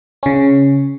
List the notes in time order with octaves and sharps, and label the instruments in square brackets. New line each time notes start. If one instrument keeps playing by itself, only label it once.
[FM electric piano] C#3 C#4